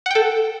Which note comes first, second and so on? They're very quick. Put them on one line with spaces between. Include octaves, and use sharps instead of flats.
F#5 G5 A4